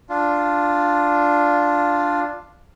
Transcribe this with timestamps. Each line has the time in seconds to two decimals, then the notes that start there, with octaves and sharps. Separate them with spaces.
0.09 D4 F4